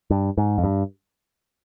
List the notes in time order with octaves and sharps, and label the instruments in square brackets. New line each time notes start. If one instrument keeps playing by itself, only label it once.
[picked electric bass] G2
G#2
F2
G2